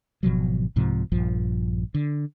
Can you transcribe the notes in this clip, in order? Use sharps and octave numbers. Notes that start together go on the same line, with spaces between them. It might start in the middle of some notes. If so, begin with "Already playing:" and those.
G#1 B2 F3 F#3
C2 G#2 C3 F3
A#1 G2 F3
D3